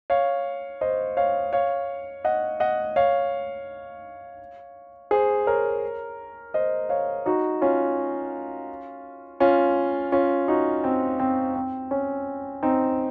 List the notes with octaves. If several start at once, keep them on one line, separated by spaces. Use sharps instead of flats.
C#5 F5
C5 D#5
C#5 F5
C#5 F5
D#5 F#5
D#5 F#5
C#5 F5
G#4 C5
A#4 C#5
C5 D#5
C#5 F5
D#4 F#4
C#4 F4
C#4 F4
C#4 F4
D#4 F#4
C4
C4
C4
C#4
C4 D#4